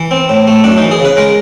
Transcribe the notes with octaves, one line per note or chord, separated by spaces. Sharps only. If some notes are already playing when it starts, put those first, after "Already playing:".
Already playing: E3
C4
A2
A3
F#2 D4
E3 D#4
G#4
C#3
B4
G#3 A#4